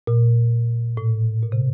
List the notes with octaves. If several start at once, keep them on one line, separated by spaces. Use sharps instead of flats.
A#2
A2
A#2
C3